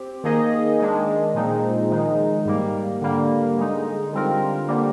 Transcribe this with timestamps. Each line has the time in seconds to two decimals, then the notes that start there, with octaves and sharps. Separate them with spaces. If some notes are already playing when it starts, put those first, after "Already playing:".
Already playing: C4 G4
0.24 D#3 A#3 D#4 G#4 D#5
0.79 D#3 G#3 D4
1.34 A#2 F3 G#3 C4 D#4
1.91 D#3 G#3 D#4
2.45 G#2 G3 A#3
3.01 D3 G3 A#3
3.57 D3 G#3 D#4
4.13 D3 G3 C4 F4 A#4
4.68 D3 G3 A#3